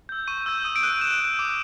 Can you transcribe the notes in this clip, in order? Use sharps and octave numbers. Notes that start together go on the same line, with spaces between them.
E6 G6
C#6 D#7
E6 G6
D#6 D#7
D7
F#6 D#7
D#6 E7
F#6
D6